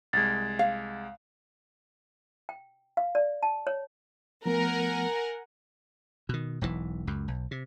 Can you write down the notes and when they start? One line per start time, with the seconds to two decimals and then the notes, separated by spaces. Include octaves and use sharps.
0.13 C2 G#3 G#6 A6
0.59 F5
2.49 G5
2.97 F5
3.15 D5
3.43 A5
3.67 C#5
4.46 F3 A3 B3 A#4 F#5 G#5
6.29 B2 D#3
6.61 E1 B1 C3 E3
7.07 C#2 F#2
7.28 B1
7.51 C3